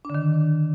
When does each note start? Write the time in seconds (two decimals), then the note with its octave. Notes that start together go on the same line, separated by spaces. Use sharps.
0.05 D4
0.10 D3
0.15 D#3